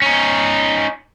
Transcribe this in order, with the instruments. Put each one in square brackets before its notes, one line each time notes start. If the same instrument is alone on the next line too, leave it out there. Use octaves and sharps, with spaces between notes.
[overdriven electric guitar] C#4 D#4